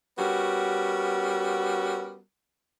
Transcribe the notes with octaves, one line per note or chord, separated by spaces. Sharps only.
G3 B3 C#4 F#4 A#4